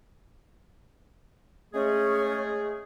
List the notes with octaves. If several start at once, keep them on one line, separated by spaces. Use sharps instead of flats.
G#3 A3 C#4 G#4